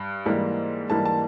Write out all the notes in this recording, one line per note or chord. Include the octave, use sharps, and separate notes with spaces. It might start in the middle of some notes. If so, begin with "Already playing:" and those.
Already playing: G2
G#2 E3 G3 A#3
G#2 E3 G3 A#3 A5
A5